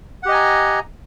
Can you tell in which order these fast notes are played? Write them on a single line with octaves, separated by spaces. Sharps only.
F#5 G4 D#5 G#5 A#5